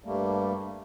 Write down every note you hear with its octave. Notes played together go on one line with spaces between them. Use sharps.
G2 G3 A3 A#3